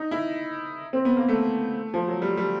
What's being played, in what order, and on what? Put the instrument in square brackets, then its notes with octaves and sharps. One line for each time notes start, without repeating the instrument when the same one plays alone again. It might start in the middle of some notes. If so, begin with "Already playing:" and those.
Already playing: [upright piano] D#4
E4
C4
B3
A#3
A3
F3
F#3
G3
G3